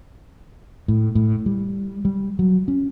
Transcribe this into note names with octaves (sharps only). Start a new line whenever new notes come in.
A2
A2
G3
G3
F#3
C#4